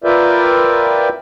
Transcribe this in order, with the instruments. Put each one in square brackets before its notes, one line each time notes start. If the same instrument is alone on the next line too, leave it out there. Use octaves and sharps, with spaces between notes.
[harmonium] F4 A#4 B4 D5 E5 G5